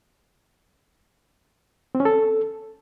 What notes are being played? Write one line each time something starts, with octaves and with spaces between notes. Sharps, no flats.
C4
C#4
A4